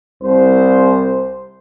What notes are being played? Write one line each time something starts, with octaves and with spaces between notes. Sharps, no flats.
C2 C5